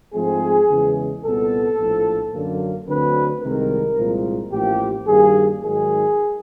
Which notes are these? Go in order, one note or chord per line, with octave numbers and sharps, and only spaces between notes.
G#2 F3 A3 C4 G#4
E2 C#3 E3 G#3
C2 A#2 G3 B3 A4
A#1 A2 F3
F#2 D3 F#3 A#3
D2 D3 F#3 A3 C4 B4
C2 C3 D#3 G#3 A#4
C2 A#2 F3 G#3
A1 A2 F3 A#3 G4
G2 D#3 G3 A#3 G#4
G#2 D#3 F#3 G#4